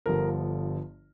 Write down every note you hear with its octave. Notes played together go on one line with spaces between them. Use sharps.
G1 G2 D3 F3 A#4